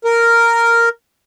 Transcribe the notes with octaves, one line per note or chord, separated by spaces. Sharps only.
A#4